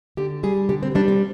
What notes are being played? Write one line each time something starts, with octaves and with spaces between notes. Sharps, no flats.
D3 G4
G3 G#4
D3 G4
C4
G3 D4
C4